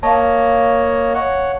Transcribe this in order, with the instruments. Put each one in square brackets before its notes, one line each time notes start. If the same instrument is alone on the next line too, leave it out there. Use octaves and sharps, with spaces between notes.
[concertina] A#3 C#5 D#5 [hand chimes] F5 A5
[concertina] C#5 F#5